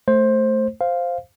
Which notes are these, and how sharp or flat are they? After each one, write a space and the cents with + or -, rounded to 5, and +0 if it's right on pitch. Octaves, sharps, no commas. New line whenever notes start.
A3 +0 C5 +15
C5 +0 F5 +0